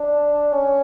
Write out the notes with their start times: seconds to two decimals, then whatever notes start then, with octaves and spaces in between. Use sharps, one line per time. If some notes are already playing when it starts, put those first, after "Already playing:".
Already playing: D4
0.52 C#4